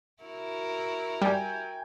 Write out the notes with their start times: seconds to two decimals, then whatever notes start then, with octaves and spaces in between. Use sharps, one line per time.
0.23 E4 F#4 A#4
1.22 G3 G5 G#5